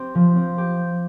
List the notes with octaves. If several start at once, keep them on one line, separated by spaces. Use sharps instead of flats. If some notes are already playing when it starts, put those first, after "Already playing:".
Already playing: C4 G4
F3
C4
G4